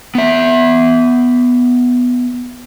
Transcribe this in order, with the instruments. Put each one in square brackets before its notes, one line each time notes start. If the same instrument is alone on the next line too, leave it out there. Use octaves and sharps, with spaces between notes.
[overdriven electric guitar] B3 E5